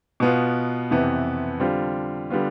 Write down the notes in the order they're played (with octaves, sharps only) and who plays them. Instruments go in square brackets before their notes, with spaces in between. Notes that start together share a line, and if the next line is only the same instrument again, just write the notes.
[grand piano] B2 B3 F4
F2 C3 E3 B3
D3 G3 C4 F4
D3 G3 B3 F4